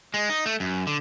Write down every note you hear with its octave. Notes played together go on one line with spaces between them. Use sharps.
G#3
D#4
A3
F#2
D3